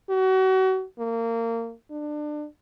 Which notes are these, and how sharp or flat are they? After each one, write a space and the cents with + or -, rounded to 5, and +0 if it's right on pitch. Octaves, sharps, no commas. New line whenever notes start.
F#4 +35
A#3 -25
D4 +25